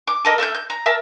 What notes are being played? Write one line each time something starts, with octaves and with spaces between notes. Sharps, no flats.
D6
A4 A#4 D#5
A3 E5 F6 G6
G6
A#5
A#4 E5 A5